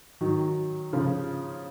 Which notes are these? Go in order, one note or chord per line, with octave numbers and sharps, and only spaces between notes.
D#3 F#3
C#3 F3